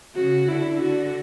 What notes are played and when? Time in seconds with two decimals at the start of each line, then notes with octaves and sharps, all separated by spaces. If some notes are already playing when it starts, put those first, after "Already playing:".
0.15 C#3 F#4
0.48 D3 E4
0.82 F#4